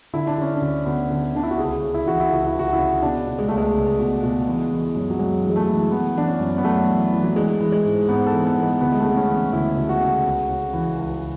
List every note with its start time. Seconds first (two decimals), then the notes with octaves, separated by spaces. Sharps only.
0.13 D3 E4
0.27 D4
0.38 D3 C#4
0.55 D4
0.61 D2
0.86 D2 B3
1.10 D3
1.35 D3 D4
1.43 E4
1.51 F#4
1.58 C#2 G#4
1.82 C#3
1.94 E4
2.06 E3 F#4
2.20 E4
2.30 C#2 F#4
2.46 E4
2.55 C#2 F#4
2.73 E4
2.78 C#3
3.02 B2 D4
3.27 B2
3.39 G#3
3.48 C#2 A3
3.58 G#3
3.75 C#2
3.99 B2
4.23 B2
4.47 E3
4.72 E3
4.96 F#2
5.10 F#3
5.19 F#2 G#3
5.43 E3
5.50 G#3
5.56 A3
5.67 E3
5.91 E3 B3
6.15 E3 D4
6.27 C#4
6.40 F#2
6.58 B3
6.64 F#2 A3
6.89 E3
7.12 E3
7.23 F#3
7.36 E3 G#3
7.60 E3
7.72 G#3
7.84 G#2
8.09 G#2 B3
8.26 A4
8.33 E3
8.45 B3
8.57 E3
8.63 G#3
8.81 D2 B3
8.92 G#3
9.00 A3
9.05 C#3 B3
9.17 C#4
9.29 E3
9.53 D2 E4
9.77 D2
9.89 F#4
10.01 C#3
10.26 C#2
10.49 C#3
10.73 E3
10.97 C#2